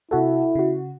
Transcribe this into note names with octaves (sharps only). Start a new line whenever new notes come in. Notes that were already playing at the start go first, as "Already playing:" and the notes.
C3 E4 F#4 A4
C#3 F#4